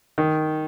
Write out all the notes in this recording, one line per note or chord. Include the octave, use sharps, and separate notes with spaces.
D#3